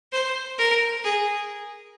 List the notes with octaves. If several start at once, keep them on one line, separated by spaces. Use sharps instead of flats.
C5
A#4
G#4